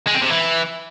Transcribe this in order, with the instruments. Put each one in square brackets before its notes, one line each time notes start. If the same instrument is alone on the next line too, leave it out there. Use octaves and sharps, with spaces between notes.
[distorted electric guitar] G#3
C4
C3
E3